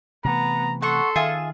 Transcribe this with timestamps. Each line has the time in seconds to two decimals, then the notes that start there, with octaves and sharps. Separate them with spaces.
0.24 C3 E3 A3 B3 A#5
0.82 A4 F#5 C6 C#6
1.16 D#3 F4 G#4 E5